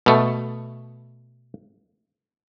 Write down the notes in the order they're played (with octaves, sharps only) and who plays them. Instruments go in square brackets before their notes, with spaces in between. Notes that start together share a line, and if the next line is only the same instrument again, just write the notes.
[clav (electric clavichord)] B2 A3